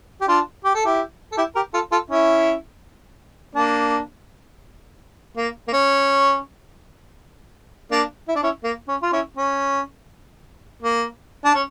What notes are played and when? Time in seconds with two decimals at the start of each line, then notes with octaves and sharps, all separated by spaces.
0.21 G4
0.28 D4 F4
0.65 G4
0.75 A4
0.85 E4 G4
1.32 A4
1.37 E4 G4
1.56 G4 A#4
1.74 F4 A4
1.92 F4 A4
2.10 C#4 E4
3.55 A#3 D4
5.37 A#3
5.68 A#3
5.73 C#4
7.91 A#3 D4
8.28 E4
8.35 D4
8.43 C#4 E4
8.64 A#3
8.88 C#4
9.02 F4
9.12 C#4 E4
9.37 C#4
10.82 A#3
11.44 D4
11.55 C#4